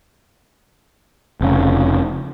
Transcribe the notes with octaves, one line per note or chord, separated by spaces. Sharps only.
F1 C#3